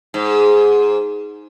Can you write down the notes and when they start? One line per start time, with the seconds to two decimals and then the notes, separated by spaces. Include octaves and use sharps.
0.14 G#2